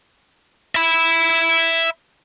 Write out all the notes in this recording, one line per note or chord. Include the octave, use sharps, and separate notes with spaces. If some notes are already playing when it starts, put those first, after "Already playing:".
E5 B5